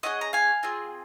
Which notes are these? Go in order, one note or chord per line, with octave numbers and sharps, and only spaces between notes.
C#4 F4 G#4 D#5 F#5
A#5
F5 G#5
C4 F4 G#4